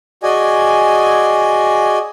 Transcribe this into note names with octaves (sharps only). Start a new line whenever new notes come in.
F#4 G#4 D5 D#5 G#5